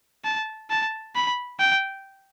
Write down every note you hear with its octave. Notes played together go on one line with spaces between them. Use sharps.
A5
A5
B5
G5